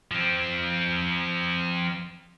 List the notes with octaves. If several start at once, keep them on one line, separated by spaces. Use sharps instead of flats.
F3 C4